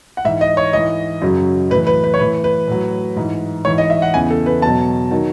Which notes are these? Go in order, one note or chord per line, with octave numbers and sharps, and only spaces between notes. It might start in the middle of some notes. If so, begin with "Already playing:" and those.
F#5
G#2 E3 E5
D#5
C#5
G#2 E3 D#5
F#2 C#3 F#3
A2 E3 B4
B4
B4
C#5
A2 E3 B4
B4
A2 F#3
G#2 E3
G#2 E3 C#5
D#5
E5
F#5
E2 C#3 E3 G#5
A4
B4
E2 B2 F#3 A5
D#3 F#3